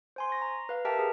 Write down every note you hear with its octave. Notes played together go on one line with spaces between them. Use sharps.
C5 G#5 C6
C#6 A#6
A#5
B4 F5
G4 A#4 E5 G5 A5 A#5
G#4 A#4